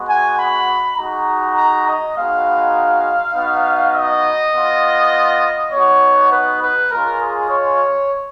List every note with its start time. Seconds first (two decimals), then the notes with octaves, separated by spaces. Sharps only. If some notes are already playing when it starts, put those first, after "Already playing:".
Already playing: G#3 B3 F#4
0.09 G#5
0.39 B5
0.98 G#3 D#4 F#4 A#5
1.57 A#5
1.87 D#5
2.16 G#3 B3 D#4 F#4 F5
3.35 B3 D#4 F#4
3.95 D#5
4.55 B3 F4
5.72 B3 D#4 F#4 C#5
6.32 B4
6.62 B4
6.91 G#3 C#4 F4 A#4
7.21 G#4
7.50 C#5